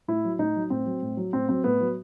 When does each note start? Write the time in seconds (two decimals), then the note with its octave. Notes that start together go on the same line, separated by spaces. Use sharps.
0.08 A2 E4
0.25 F#3
0.39 A2 D#4
0.56 F#3
0.70 A2 C4
0.86 F#3
1.02 A2
1.17 F#3
1.33 A2 C4
1.49 F#3 C4
1.64 A2 B3
1.81 F#3